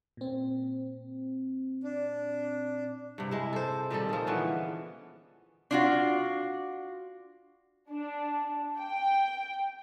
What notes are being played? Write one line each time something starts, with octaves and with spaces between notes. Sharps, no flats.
A#2 C4
D4
G2 C3
G#3 E4
A4 C5
A#2 D#3 G3 A4
F3 G#4
D3 E3 B3 C#4
D4 F4 F#4
D4
G5